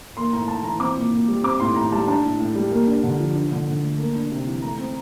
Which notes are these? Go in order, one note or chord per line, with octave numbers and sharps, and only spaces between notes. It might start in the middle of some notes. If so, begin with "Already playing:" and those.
A#3 C6
A2 A#5
A2 A5
E3 A#5
C4 D6
A#2
A#2
G3
C4 D6
A2 C6
A2 A#5
G3 A5
D4 A5
A2
A2
G3
A#3
D4
D3
F3
D4
D3
D3
A3
A#3
D4
C3
E3
A3 A#5
C4